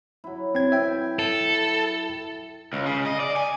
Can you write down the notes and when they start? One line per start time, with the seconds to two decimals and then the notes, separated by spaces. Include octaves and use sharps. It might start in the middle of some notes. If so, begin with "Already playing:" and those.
0.24 F#3 E4
0.55 C4 G#6
0.72 B4 E5 G5
1.19 A4
2.73 C#2
2.86 C#3
3.06 D#5
3.20 D5
3.37 G#5